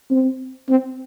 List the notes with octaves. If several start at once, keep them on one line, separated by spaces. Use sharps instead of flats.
C4
C4